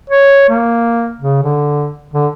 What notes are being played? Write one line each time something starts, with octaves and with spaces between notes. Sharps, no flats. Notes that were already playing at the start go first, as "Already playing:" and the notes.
C#5
A#3
C#3
D3
D3